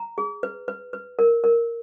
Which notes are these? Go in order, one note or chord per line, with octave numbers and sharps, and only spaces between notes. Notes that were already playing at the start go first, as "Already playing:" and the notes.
Already playing: A#5
G#4
B4
B4
B4
A#4
A#4